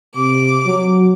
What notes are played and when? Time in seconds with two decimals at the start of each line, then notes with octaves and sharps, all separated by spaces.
0.16 C3 D6
0.65 F#3